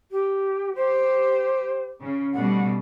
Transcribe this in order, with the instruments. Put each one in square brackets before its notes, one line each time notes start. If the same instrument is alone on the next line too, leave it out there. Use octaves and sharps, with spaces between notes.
[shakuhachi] G4
[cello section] G4 [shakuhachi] C5
[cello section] C#3
[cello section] B2 G3 A3 [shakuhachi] F#5